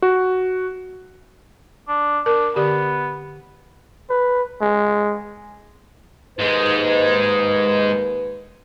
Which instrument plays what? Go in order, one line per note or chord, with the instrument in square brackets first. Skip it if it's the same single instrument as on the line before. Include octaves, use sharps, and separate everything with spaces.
[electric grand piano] F#4
[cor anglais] D4
[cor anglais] D4 [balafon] A#4
[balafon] D3 G4 D5 [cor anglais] B3
[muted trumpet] B4
G#3
[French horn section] D#2 A#3 B4 [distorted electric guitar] G#2 G#3